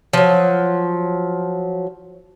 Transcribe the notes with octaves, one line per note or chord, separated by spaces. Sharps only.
F3 F#3